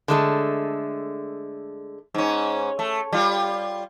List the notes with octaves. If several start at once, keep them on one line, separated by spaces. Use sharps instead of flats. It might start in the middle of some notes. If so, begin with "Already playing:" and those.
D3 G#3 A3
G#2 C#4
A3
G3 F4